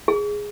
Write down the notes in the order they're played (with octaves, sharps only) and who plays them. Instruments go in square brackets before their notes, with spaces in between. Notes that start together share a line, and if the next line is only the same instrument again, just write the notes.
[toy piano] G#4